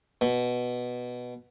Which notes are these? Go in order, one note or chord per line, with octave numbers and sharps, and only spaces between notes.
B2